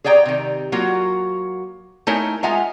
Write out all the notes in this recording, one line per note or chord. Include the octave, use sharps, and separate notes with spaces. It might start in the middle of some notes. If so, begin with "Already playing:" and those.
G#4 C#5 D5 G5 A#5
C3 D#3
F#3 A#3 F4 F#4
A3 D#4 E4 A#4 C#5 G#5
G#3 F4 E5 F#5 G#5 A#5